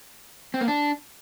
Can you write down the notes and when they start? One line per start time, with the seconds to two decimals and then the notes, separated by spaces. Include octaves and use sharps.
0.54 C4
0.61 A#3
0.68 D4